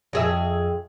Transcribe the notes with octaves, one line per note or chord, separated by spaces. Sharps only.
F2 G#4 E5